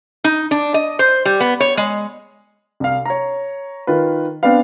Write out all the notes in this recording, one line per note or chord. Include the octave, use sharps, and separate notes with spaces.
D#4
D4
D#5
C5
G3
B3
C#5
G#3
C2 F5
C#5 A#5
D#3 F4 B4
B3 C4 D4 B4 F5